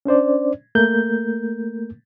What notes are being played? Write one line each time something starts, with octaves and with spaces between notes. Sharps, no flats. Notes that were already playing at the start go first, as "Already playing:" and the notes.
C#4 D4 C5 D5
A3 A#3 A#4 G6